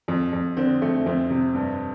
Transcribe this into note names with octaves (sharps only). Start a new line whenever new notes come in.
F2
F2
D3 C4
F2 A3
F2 C4
C3
G2